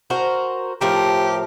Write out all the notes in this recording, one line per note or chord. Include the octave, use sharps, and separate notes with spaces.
F#4 A#4 C5
A2 F3 G4 A#4